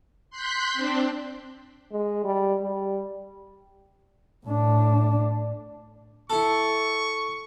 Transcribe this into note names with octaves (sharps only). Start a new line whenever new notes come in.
C6 F#6 G6 B6
C4 D4
G#3
G3
G3
A2 D4
E4 A4 C#6